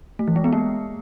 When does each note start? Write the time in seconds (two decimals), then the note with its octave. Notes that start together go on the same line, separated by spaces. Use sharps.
0.19 A3
0.28 E3
0.36 G#3
0.44 B3
0.53 A#3